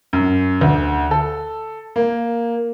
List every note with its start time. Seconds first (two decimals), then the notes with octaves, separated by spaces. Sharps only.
0.13 F#2
0.61 D2
1.11 A4
1.96 A#3